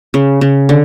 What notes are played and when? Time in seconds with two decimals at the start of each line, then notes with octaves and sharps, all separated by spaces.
0.14 C#3
0.41 C#3
0.69 D3